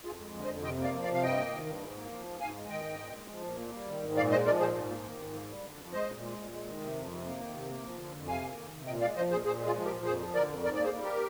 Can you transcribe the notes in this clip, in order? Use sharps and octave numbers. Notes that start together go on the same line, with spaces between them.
F2 F4 G#4
G#3
D3
C5 D#5
F2
C3 D#5 G5
A#3
D5 F5
F3
D5 F5
C3
F5
G2 D#5 G5
A#3
D#3
G2
G#2
A#3
F3
G#2
G#2 F5 G#5
G#3
D#3 D#5 G5
G#2
A#2
G#3
F3
A#2
A#3
G3
D#3
G#2
A#2 D5 F5
G#3 C5 D#5
F3 A#4 D5
A#2 G#4 C5
G#2
A#3
D#3
G#2
A#3
G3
D3
F2
G#3 C5 D#5
A#2
G#3
A#2
G#3
D#3
C3
F2
C3
A#3
D#3
C3
A#3
F3
D3
F2
C3 F5 G#5
A#3
D#3
C3
A#2 D#5 G5
G#3 D5 F5
F3 C5 D#5
A#2 G#4 C5
A#2 G#4 C5
G#3
F4 G#4
F3
G4 A#4
A#2
F2 G#4 C5
F3
D3 A#4 D5
F2
G#2 A#4 D5
D5
A#3
G#4 C5
G3
G4 A#4